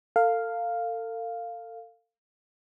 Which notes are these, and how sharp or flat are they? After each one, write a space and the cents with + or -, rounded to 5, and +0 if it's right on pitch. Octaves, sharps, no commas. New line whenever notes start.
A4 +40 F5 +0